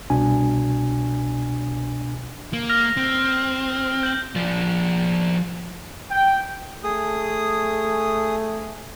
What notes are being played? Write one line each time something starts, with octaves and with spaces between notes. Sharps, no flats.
C2 B2 D4 G#5
A#3
F6 A#6 F7
C4
G6 F#7
F3 D5
G5
A3 G#4 D#6